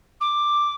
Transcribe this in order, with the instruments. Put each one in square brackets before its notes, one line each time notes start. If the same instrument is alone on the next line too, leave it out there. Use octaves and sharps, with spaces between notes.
[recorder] D6